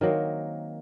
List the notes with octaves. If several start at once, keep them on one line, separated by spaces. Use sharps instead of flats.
D#3 F#3 A#3 C4